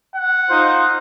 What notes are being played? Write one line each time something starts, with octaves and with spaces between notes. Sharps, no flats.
F#5
D#4 F4 C5